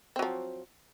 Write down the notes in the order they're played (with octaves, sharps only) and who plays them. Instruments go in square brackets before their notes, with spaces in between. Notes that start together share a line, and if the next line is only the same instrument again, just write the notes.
[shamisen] C4
F#3
F3